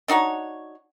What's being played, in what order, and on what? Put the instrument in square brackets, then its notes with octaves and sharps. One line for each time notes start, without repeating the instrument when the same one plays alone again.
[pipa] D4 D#4 F#4 C#5